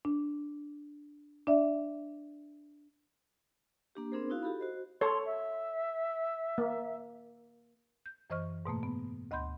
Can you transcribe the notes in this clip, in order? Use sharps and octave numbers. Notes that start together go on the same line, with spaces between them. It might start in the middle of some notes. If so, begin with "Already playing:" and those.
D4
D4 D5 E5
A#3 D4 G4
B3 C4 D4 G#4 A#4 C5
D#4 E4 F#4 F5
F#4 G4 A4 B5
F#4 C5 D#5
A4 C#5 C6
E5
A#3
G6
F#2 E3 C5 D#5 C#6 F6
G#2 B2 A3 A#3
B3
D2 D#5 F#5 B5 C6 G6